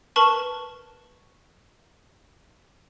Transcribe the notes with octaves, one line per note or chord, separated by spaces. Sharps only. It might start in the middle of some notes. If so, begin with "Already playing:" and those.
A#4 B4 A5 C#6 F#7